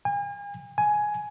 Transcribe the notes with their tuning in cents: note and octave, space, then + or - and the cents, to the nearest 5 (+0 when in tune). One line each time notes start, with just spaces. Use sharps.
G#5 -40
G#5 +10